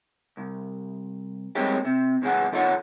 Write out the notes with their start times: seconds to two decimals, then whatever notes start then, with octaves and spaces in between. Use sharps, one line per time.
0.37 C2
1.55 G3 G#3 A#3 C4 C#4 G4
1.85 C3
2.22 C#2 C#3 E3 G#4 F#5
2.52 D#3 F4 A4 C#5 D5 F#5